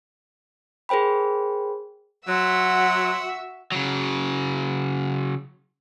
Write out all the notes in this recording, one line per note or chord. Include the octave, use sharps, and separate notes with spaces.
G#4 A#4 C5 G5 B5
F#3 F#4 E5 F#5 C6 E6
C#3 F#3